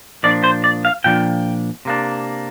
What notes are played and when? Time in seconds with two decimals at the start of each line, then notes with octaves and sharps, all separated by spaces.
0.23 A#2 F3 D4 D5
0.44 C5
0.64 D5
0.85 F5
1.04 A#2 F3 D4 G5
1.85 C3 A#3 D4